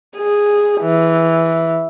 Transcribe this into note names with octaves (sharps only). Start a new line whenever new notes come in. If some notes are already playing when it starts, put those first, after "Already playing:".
G#4
E3